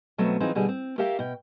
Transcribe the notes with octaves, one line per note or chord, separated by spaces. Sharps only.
B2 F#3 A3 B3 C4
E3 F#3 C4 D#4 F4 G#4
B2 D3 G3 G#4
C4
G4 A#4 C#5 E5 F5 G5
B2 G5